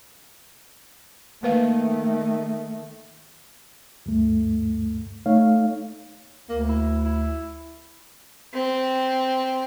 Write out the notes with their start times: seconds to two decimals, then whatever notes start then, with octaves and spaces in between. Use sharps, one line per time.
1.43 D#3 A3 A#3 B4 F5
4.06 D2 G2 A3
5.26 A3 D#4 C#5 F5
6.49 D2 A#3
6.69 E4
7.04 E4
8.53 C4